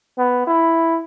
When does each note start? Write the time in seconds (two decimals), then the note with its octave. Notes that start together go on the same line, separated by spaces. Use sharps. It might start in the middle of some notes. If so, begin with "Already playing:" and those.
0.18 B3
0.47 E4